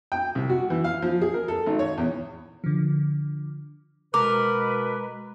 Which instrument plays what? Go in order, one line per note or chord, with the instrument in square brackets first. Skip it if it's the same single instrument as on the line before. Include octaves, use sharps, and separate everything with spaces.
[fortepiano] G5
C2
F#4
E3
F5
F3
G#4
A#4
A4
G#1
C#5
E2
[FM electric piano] D3 F3
[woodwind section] B2 B4 [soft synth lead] G#3 [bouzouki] A#4 [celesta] D6